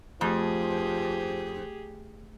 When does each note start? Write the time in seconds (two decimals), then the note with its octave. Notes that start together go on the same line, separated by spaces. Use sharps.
0.21 F2 F3 A3 G4 G#4